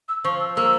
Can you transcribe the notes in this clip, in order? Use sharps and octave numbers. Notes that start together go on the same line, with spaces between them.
E6
F3 C#6
E6
A#3 E6